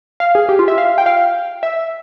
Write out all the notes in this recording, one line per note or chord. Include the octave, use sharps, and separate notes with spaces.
F5
G#4
G4
F4
E5
F5
G5
F5
E5